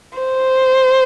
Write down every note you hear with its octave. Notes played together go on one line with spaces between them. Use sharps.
C5